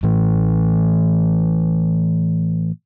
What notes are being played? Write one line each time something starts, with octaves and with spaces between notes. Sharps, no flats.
A2 E3